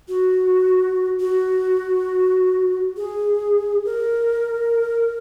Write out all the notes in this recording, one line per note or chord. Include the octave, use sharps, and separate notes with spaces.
F#4
F#4
G#4
A#4